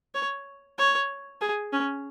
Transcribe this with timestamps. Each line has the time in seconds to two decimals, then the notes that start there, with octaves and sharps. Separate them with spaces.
0.15 C#5
0.78 C#5
1.41 G#4
1.73 C#4